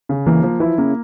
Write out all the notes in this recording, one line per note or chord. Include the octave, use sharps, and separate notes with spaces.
C#3
E3 A#3
F3
E3 E4
C#3 A#3